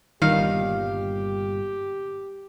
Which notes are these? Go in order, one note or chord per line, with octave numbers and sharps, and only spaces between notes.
G1 G2 A#2 D#3 G4 F5